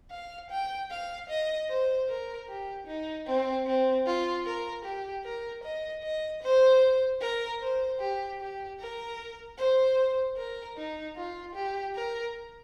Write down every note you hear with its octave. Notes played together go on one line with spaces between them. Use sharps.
F5
G5
F5
D#5
C5
A#4
G4
D#4
C4
C4
F4
A#4
G4
A#4
D#5
D#5
C5
A#4
C5
G4
G4
A#4
C5
A#4
D#4
F4
G4
A#4